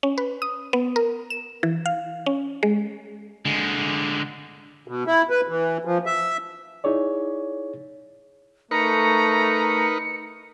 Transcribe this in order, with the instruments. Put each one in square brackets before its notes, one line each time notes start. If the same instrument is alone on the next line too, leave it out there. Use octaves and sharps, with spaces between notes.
[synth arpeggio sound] C#4
B4
D#6
B3
A#4
E7
E3
F5
C#4
G#3
[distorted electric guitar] D3 G#3
[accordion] B2
E4
B4
E3
F3
E5
[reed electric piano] D#4 E4 G#4 C#5 D5
[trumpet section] A3 [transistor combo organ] D#4 A#4 B4 [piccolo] A#5 [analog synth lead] C#7